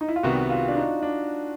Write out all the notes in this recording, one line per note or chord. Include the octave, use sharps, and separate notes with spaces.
D#4
E4
F4
C2 C3 D#3 G3 B3 F#4
F4
D4
D#4
D4